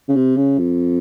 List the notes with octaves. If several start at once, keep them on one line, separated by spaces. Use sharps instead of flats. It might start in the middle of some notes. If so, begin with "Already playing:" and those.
C#3
C3
C#3
F2